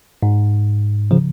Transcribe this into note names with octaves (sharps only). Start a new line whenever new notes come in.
G#2
C#3 F3